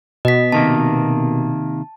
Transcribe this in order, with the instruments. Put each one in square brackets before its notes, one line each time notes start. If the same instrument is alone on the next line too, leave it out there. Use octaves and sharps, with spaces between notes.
[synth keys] B2 [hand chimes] D#5 B6
[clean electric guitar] C3 D#3 A#3 [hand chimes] A5